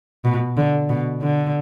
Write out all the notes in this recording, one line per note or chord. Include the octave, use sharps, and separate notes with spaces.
B2
D3
B2
D3